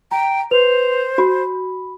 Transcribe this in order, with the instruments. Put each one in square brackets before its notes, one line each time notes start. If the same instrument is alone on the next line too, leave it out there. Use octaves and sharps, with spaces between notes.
[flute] G5 [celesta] A#5
[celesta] B4 F7 [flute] C5
[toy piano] F#4 [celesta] B5